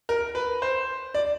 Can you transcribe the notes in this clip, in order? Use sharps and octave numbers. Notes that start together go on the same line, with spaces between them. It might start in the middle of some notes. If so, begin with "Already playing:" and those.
A#4
B4
C5
D5